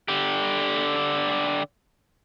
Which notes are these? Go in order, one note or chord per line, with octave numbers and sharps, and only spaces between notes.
D3 G4